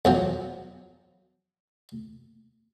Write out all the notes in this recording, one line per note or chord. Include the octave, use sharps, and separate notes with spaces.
E2 F3 F#3